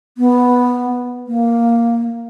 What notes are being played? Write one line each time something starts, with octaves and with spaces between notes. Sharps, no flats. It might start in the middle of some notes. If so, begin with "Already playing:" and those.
B3
A#3